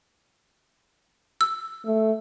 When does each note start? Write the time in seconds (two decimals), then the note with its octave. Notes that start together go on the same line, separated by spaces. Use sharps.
1.41 E6
1.86 A3